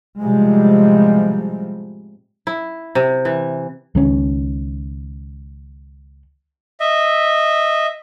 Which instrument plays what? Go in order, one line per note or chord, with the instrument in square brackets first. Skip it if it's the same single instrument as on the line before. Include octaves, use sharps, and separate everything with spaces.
[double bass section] A2 C3 F3 G3 G#3
[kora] E4
C3
E3
[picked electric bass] C#2 D#3 C#4
[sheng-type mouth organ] D#5 E5